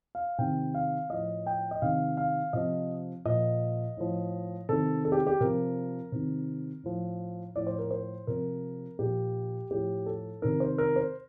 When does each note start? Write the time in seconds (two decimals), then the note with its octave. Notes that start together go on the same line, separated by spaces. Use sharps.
0.15 F5
0.38 C3 D#3 G5
0.75 F5
1.10 A2 F3 D#5
1.46 G5
1.71 D#5
1.82 C3 D#3 F5
2.17 F5
2.53 C3 F3 D#5
3.25 A#2 F3 D#5
3.97 A2 F3
4.69 C3 D#3 A4
5.05 A4
5.12 G4
5.27 G4
5.40 C3 F3 A#4
6.12 C3 D#3
6.83 A2 F3
7.56 A2 F3 D5
7.67 C5
7.79 A#4
7.91 C5
8.27 C3 F3 A#4
8.99 A#2 F3 G4
9.71 A2 F3 G4
10.06 A4
10.42 C3 D#3 A#4
10.60 C5
10.78 A#4
10.96 C5